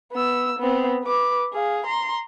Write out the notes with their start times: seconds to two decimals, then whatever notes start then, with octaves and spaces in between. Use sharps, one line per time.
0.12 B3 E6
0.59 B3 C4
1.04 B4 D6
1.53 G#4 F5
1.86 A#5 C6